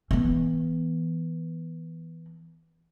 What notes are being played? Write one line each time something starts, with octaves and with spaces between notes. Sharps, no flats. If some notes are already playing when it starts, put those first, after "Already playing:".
E3 B3